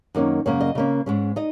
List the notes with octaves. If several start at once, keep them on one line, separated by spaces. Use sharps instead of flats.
F#2 D#3 A#3 C#4
F#2 C#3 A#3 C#4 C#5
D#5
C#3 A#3 C#4
G#2 G#3 C#4
D#4 D#5